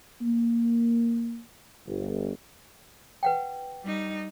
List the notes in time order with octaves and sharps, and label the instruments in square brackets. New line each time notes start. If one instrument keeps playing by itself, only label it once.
[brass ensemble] A#3
G1
[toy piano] B4 F#5 G5
[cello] G3 D#4